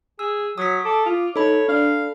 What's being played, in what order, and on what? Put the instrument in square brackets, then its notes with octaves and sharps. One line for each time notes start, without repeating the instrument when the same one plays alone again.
[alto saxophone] G#4 [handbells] E6
[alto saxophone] F#3 [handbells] D#6 B6
[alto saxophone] A4 [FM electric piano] D6
[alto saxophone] F4
[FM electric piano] D#4 [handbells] A4 B5 [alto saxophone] C#5
[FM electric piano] D4 [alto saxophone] F5